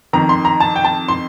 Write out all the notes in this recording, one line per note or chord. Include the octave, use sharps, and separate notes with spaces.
F2 D#3 A#5
C6
A#5
A5
G5
A5
C6